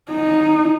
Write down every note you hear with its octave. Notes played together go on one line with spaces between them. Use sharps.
D#4